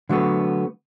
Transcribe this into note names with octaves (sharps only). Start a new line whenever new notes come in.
D3 F#3 A3 B3